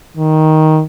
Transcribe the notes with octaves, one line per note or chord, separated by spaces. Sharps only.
D#3